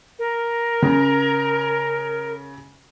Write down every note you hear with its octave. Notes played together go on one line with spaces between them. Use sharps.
A#4
C#3